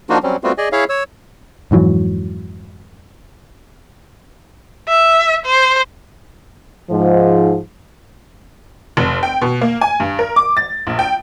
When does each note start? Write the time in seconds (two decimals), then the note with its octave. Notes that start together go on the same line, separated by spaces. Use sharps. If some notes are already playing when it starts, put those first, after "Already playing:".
0.10 F3 A#3 D4 D#4 F4 F#4
0.23 F#3 G3 C4 C#4
0.44 G3 A3 B3 C4 F4 F#4
0.58 G#4 D5 D#5 G#5
0.72 E4 G#4 C#5 E5 F5
0.89 C#5 E6
1.71 F2 G#2 E3 F#3
4.88 E5
5.46 C5
6.90 G#2 F3
8.97 F1
9.23 G5
9.41 B2
9.61 A#3
9.81 G#5
10.00 G2
10.19 A#4
10.36 D6
10.57 A6
10.87 A#1
10.99 G5